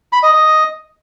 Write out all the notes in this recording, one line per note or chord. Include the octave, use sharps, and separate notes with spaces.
B5
D#5
D#5